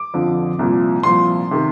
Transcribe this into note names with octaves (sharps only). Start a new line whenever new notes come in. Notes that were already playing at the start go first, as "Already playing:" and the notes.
Already playing: D6
F2 D3 F3
C2 A#2 F3
C2 A#2 F3 C6
C3 D#3